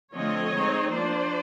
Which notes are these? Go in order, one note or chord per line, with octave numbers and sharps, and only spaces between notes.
D3 F3 A3 C4 C#5 D#5
G#3 C4 D#4
F3 A#3 D4 C5 D5